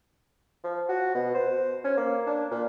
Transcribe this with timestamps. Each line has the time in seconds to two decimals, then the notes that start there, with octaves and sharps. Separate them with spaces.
0.64 F3
0.89 F#4
1.15 B2
1.35 C5
1.84 C#4
1.97 A#3
2.27 D4
2.51 A#2